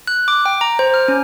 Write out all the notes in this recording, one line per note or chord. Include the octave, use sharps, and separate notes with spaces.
F#6
D6
G5
A#5
C5
F6
C#4